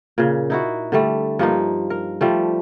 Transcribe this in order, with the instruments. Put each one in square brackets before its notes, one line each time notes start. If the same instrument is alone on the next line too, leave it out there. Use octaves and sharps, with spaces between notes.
[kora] A#2 C#3
D#4 E4 F#4
D3 G3 A3
G2 F3 A#3 D#4
A#4
F3 G3 A3